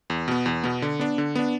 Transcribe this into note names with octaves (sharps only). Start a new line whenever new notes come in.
E2
B2 B3
E2
B2 B3
D3
B3 D4
D3
B3 D4